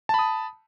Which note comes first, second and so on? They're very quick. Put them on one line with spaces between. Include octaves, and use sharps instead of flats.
A5 B5 D#6